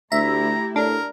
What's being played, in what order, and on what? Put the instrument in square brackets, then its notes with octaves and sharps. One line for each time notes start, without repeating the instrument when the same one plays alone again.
[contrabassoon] D2 [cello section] A3 E4 G4 [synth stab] E5 [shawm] A#5
[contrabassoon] A2 [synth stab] D4 [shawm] A#4